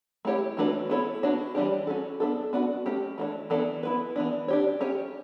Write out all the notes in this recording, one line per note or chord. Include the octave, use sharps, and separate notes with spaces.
A3 E4 G4 C#5
E3 A3 D4 F#4 B4
B3 E4 A4 C#5
B3 D4 F#4 C#5
E3 G3 D4 G4
C#4 F#4 A4
B3 D4 A4
B3 D4 F#4
A3 C#4 G4
E3 A3 D4
E3 B3 D4 A4 D5
B3 E4 B4
E3 B3 D4
D4 G4 C#5
C#4 G4 C#5